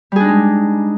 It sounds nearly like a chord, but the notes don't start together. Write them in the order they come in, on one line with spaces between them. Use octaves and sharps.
G3 G#4 D4 D#4 G#3